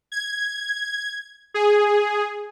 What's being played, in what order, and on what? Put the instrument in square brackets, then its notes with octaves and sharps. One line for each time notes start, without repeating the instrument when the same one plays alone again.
[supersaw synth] G#6
G#4